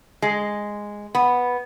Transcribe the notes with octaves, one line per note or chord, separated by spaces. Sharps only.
G#3
B3